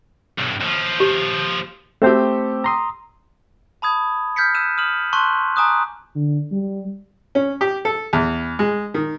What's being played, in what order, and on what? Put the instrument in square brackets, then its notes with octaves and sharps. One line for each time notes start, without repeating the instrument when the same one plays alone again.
[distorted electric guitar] B1 G2
D#2 F3
[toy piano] G4
[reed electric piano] A3 C4 C5 [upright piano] G4 A4
[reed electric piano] A#5 C6 D#6
[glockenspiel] A5 B5 D#6 G#6
F6 G6 G#6 B6 C#7
E6 F#6 D#7 E7
D#6 F6 D#7 E7 F#7
A5 C6 C#6 F#6 D#7
G#5 A#5 D6 D#6 F#6
[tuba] D3
G3
[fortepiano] C#4
G4
A4
E2
G#3
D#3